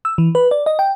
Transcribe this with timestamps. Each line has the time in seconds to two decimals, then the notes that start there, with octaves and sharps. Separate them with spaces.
0.05 E6
0.18 E3
0.35 B4
0.51 D5
0.66 D#5
0.79 G5